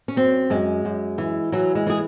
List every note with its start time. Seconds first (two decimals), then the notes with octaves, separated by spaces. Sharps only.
0.08 C#4
0.16 F#2 C4
0.50 F#2 G#3
0.85 F#2
1.18 E3
1.52 E3 F#3
1.75 G#3
1.86 E3 G#4